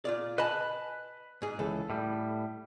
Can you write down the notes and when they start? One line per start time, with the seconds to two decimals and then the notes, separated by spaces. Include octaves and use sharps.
0.05 A#2 F4 D5
0.38 B4 D#5 G#5 A5 B5
1.42 G#2 G#4
1.59 C#2 E3 A4
1.90 A2 G3